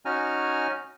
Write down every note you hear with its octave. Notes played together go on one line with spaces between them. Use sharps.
C#4 D#4 F#4 G#5 A#5 F6